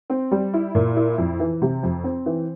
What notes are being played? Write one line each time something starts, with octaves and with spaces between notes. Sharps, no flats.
C4
G3
E4
A#2
E4
F2
E3
C3
F2
C4
E3